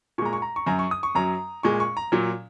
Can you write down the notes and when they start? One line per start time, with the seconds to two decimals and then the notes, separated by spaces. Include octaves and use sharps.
0.18 A#2 C#6
0.22 G#3 A#5
0.33 C#6
0.42 A#5
0.56 C#6
0.66 F#2 F#3 A#5
0.79 C#6
0.91 D#6
1.03 C#6
1.15 F#2 F#3 A#5
1.63 A#2 G#3 C#6
1.80 C#6
1.97 A#5
2.12 A#2 F#3